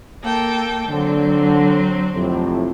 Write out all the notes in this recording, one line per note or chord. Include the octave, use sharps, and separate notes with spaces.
A#3 A4 G5
D3 F#3 C4
F2 A2 C3